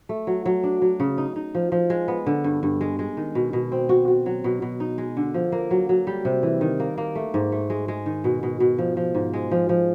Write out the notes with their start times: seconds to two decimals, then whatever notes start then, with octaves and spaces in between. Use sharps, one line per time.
0.09 A3
0.27 F#3
0.45 F#3
0.63 D4
0.82 F#3
1.00 C#3
1.18 D#4
1.36 D#4
1.55 F3
1.72 F3
1.90 G#3
2.08 B3
2.26 D3
2.44 G2
2.63 G2
2.81 G#3
2.99 G#3
3.17 D#3
3.35 B2
3.53 B2
3.72 C4
3.89 F#4
4.08 F#4
4.26 F#3
4.44 B2
4.62 B2
4.80 D#4
4.98 G#3
5.17 D3
5.34 F3
5.52 A#3
5.71 F#3
5.89 F#3
6.07 G3
6.25 C3
6.43 E3
6.61 D#3
6.80 A#3
6.98 A#3
7.15 A3
7.34 G#2
7.52 A3
7.70 G#3
7.88 G#3
8.06 D#3
8.24 B2
8.43 B2
8.60 B2
8.78 F3
8.97 F3
9.15 G#2
9.33 G#3
9.51 F3
9.69 F3